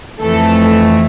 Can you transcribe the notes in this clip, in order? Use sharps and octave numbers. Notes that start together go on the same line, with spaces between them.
F2 E3 A3 A4